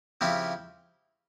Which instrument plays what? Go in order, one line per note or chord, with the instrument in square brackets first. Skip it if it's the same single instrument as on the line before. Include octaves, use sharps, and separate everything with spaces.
[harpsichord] C#3 F3 C4 E4 G4